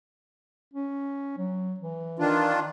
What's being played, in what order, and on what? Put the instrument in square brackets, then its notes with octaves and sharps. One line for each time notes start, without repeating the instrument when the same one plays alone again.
[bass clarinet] C#4
F#3
E3
[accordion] D#3 D4 F4